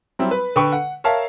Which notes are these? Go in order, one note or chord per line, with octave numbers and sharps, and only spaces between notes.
F#3 G3 C4 E4
B4
D3 B4 G5 C#6
F#5
A#4 C#5 E5 F5 A5